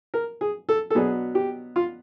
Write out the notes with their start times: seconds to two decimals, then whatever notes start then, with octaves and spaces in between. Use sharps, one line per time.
0.14 A#4
0.41 G#4
0.69 A4
0.90 A4
0.95 B2 F#3 B3 D4 G#4
1.35 G4
1.76 F4